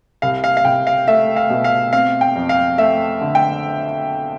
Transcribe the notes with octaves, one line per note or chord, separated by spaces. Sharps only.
C2 F5
F5
F5
C2 G5
F5
A3 E5
F5
B2
F5
C4 F5
G5
F2
F5
A3 E5
D3
G5